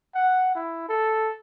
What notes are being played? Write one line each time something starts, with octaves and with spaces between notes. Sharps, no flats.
F#5
E4
A4